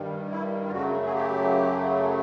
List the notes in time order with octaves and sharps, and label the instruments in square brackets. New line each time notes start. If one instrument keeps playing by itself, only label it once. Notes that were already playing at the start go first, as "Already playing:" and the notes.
Already playing: [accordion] G2 D#3 G3
E4
F4
F#2 C#3 F#3 A3 F#4
G#4
G4